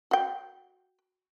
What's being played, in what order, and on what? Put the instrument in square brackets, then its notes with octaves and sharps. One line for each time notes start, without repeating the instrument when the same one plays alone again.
[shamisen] F#4 G5